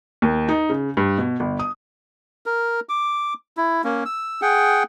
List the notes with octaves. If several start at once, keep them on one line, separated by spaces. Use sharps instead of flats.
D#2
D#4
C#3
G2
B2
G1
D#6
A#4
D6
E4
A#3 C#4
E6
G#4 F#5 G5